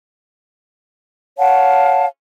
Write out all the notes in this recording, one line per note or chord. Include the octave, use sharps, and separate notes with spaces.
C#5 F5 F#5 A5